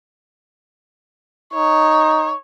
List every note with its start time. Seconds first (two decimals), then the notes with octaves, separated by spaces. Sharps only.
1.54 D#4 C#5